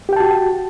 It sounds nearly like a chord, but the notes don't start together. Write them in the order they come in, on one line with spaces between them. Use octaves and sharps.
G4 G5 A5 F#4